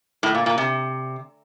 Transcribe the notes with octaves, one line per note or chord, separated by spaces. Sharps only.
A2
A#2
A#2
C3